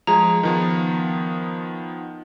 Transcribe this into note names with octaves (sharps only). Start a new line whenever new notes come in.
F3 G#3 G#4 A#5
D#3 F3 B3